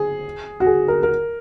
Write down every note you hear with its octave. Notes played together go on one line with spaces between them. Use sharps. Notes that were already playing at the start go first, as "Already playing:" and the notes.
Already playing: G#4
F#4
G#4
A#4
A#4